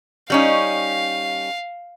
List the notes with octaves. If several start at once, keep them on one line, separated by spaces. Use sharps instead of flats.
G3 C#4 D#4 F5